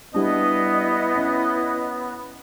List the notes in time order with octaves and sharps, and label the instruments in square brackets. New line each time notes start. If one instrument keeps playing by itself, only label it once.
[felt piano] G3 D4 [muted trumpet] B3 [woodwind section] E4 D#5
[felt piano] C#4